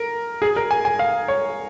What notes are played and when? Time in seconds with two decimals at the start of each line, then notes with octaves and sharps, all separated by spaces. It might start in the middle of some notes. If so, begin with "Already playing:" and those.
Already playing: A#4
0.42 G#4
0.56 A#4
0.71 G#5
0.85 G#5
0.99 F5
1.28 C#5